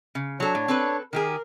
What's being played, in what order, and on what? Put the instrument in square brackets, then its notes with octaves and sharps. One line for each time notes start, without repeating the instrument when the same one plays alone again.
[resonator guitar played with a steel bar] C#3
[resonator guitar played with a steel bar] F#3 A4 [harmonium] D4 C#5
[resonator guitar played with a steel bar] A2
C4 A4 B4
[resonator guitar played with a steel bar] D#3 G4 G#4 [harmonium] A#4